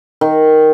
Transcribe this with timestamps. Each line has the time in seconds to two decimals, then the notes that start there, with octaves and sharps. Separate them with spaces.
0.21 D#3